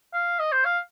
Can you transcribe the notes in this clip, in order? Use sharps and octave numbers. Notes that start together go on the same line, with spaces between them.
F5
D#5
C5
F5